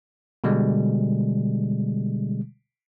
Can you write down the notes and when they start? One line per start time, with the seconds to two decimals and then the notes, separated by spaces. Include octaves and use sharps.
0.44 B2 D3 G3 G#3